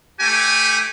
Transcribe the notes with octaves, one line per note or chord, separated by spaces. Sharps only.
A3 G4 G#5